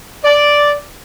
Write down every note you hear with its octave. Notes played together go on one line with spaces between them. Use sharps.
D5